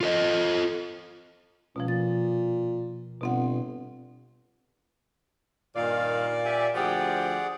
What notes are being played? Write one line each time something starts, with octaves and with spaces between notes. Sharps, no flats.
F4 A4 D#5
C#2 B2 F3
A#2 A6
G1 B2 C4 F#5
G2 A#2 D#3 D5 F5
G4 E5 G#5
D2 F3 G4 G#4 D5 F#5